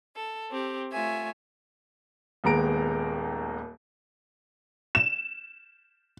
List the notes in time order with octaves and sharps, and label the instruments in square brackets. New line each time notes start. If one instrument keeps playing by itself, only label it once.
[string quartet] A4
C4 G4
A3 F4 C#5 E5 G#5
[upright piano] D#1 D#2 G#3 B3 A#5 D7
[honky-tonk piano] E7